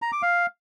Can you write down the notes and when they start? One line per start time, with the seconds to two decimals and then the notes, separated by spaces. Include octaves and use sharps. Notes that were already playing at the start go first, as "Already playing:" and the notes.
0.02 A#5
0.12 D6
0.22 F5